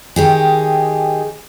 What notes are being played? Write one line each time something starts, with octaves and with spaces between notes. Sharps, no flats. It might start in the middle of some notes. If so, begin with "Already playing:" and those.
D#3 G4 G#4